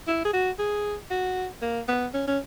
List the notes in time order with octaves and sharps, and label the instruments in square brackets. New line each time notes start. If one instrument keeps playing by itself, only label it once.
[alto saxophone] E4
G#4
F#4
G#4
F#4
A#3
B3
C#4
C#4